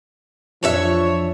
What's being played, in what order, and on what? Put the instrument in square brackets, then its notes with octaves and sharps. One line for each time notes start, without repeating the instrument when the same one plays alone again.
[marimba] F2 [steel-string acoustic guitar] E3 D4 E5 [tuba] F3 [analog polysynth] C#5